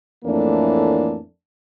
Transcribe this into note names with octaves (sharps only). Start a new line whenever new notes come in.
F2 A2 E3 A3 A#3 D4